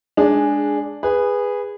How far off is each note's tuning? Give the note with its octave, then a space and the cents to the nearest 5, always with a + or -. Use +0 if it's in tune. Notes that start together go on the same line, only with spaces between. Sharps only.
G#3 +0 D4 +0 G#4 -5
G#4 -15 B4 +0